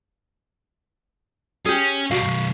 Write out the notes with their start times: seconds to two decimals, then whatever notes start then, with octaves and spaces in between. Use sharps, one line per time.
1.66 C#4 G4 G#4
2.11 B1 G3 F#4 F5
2.23 B1 F#2